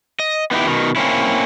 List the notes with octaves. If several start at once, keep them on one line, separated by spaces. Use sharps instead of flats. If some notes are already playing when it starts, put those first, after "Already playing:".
D#5
B3 D#4 E4 G4
B2 D#3
A#3 C4 C#4 E4